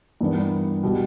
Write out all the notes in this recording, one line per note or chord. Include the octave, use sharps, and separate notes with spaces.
G2 E3 B3 D4 A#4
B2 G3